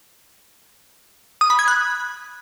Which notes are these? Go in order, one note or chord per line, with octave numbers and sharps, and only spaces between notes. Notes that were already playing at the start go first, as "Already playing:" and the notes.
D#6
B5
G#6
F#6